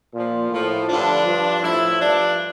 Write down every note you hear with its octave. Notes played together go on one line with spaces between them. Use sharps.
A#2 F3
A2 F3
G2 D3 F3 D4
G2 F3
A2 F3 E4
G2 F3 D4